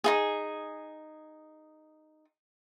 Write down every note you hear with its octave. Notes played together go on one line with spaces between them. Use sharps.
D#4 F4 G#4